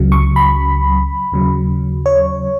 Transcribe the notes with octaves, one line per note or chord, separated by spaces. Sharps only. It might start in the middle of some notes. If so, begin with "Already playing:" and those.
Already playing: C#2 C#3 F#3
C#6
B5
D#2 C#3 F#3
C#5